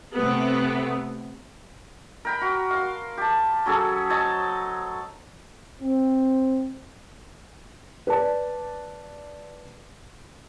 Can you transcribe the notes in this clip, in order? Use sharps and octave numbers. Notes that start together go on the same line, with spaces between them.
C3 A3 B3
A#4 G5 B5
F#4
F5 C6
G4 A5
F#3 C#4 G#4 A4
C5 C#5 D#5 A5
C4
B4 D5 A5